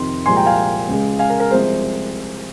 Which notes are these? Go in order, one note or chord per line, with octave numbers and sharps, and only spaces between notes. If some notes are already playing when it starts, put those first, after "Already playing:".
Already playing: F2 C3 D#3 C6
C2 A#2 F3 G#3 G#5 C6
G5 A#5
F5 G#5
C#2 C#3 G#3
F5 G#5
A#4
A#4
C2 C3 F3 G#3 C5